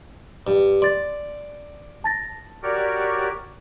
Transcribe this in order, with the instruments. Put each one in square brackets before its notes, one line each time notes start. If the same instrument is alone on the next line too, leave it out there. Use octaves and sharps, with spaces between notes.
[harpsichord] G2
[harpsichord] D5 [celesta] C6 A6
[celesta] A5 A6 A#6
[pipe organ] F#4 G4 A#4 C#5 D5